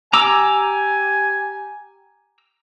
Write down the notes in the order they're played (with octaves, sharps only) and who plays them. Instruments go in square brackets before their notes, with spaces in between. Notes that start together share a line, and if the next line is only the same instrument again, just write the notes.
[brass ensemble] G4 G#5 [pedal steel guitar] A#5 D6 E6